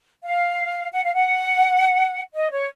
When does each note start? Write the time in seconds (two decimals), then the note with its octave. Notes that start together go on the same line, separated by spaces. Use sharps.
0.23 F5
0.93 F#5
1.04 F5
1.14 F#5
2.33 D#5
2.51 C#5